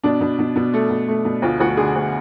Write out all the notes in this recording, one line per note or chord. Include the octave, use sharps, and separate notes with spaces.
B2 D4
B2
B2
B2
A3
B2
A3
B2
D2 F4
D2 F#4
D3 G#4
D2